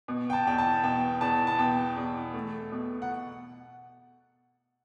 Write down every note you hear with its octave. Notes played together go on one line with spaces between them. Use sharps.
B2
G5
A5
E2 G5
A5
B2 G5
E2 A5
A5
B2 G5
E2
A3
B2
F#5